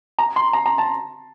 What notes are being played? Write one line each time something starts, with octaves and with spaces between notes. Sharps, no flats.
A#5
C6
A#5
A#5
A5